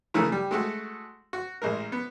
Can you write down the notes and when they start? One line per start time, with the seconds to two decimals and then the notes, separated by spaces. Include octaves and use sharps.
0.14 C#3 E3 A3 A#3
0.32 G3
0.51 G#3 A3 F#4
1.33 F#4
1.62 A1 G#3 A#4
1.92 B3